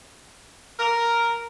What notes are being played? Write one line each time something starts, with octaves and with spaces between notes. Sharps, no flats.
A#4